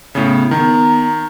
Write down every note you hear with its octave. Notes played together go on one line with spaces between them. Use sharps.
A2 C#3 B3
D#3 B3 A#5